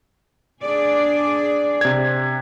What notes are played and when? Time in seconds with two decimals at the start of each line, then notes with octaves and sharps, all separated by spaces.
0.61 D4 G#4 D5
1.81 C3 G#6